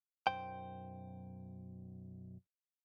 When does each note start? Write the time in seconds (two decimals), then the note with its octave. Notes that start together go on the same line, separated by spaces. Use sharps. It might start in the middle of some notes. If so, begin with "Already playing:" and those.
0.27 B1 F#2 C5 G5